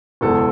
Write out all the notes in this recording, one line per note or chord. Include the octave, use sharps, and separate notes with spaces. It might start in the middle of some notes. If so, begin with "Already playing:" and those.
F#1 E2 B2 G#3 A4